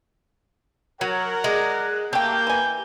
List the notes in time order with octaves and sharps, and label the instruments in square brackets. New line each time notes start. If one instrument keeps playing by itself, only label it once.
[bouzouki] F#3 [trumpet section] A#4 F#5 [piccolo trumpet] C#5
[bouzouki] G#3 [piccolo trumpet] D5
[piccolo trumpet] F#6
[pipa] A3 G5 [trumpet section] A#3 [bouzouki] G4 [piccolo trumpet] G6
[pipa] E3 G#5